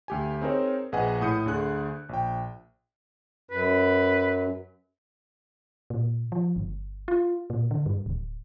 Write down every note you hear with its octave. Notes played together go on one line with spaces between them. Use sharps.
D2 G4 G#5
C4 D#4 G#4 A#4 C5 C#5
A#1 G#4 B4 D#5 F#5 G#5
A2 D#6 G6 C#7
D2 D3 A3 G#4 F#6
A#1 G5
F#2 B4
A#2
F3
G1
F4
A#2
D3
G2
D1